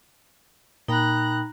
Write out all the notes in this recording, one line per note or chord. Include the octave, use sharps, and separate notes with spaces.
A#2 D#4 G5 A#5 B5 F#6